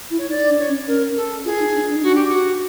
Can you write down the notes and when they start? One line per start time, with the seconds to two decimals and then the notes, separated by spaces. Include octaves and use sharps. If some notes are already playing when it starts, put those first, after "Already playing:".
0.10 E4
0.18 C#5
0.29 D#4 D5
0.49 D4
0.59 C#5
0.68 C#4
0.87 C#4 A#4
1.16 A4
1.45 F4 G#4
1.60 D#4
1.74 D4
1.89 D4
1.96 D#4
2.03 D4 F#4
2.15 G4
2.28 F#4